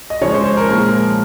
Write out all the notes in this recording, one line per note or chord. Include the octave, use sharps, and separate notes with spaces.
D#5
C#3 F3 G#3 C#5
C5
C5
A#4
A#2 F3 G#3